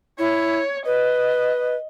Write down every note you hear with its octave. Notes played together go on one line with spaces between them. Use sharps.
E4 C#5
B4 D#5